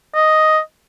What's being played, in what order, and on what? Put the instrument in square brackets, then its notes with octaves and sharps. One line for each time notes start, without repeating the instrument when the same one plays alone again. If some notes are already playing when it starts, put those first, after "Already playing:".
[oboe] D#5